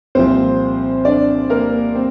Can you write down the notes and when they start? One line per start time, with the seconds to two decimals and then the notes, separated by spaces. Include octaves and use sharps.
0.15 C2 A#2 F3 C4 C5
1.05 D4 D5
1.50 A#3 A#4
1.95 C4